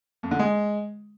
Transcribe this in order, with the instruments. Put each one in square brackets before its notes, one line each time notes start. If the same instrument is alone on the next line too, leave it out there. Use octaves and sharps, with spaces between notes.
[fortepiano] F2
D3
G#3